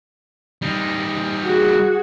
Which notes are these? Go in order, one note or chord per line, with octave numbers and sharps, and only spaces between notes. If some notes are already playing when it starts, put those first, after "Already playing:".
G3 D#4
F#4 G#4